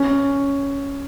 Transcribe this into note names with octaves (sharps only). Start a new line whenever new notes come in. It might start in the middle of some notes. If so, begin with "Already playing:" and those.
Already playing: C#4